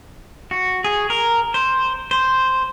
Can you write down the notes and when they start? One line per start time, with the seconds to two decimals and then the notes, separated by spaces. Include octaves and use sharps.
0.51 F#4
0.84 G#4
1.10 A#4
1.54 C5
2.11 C5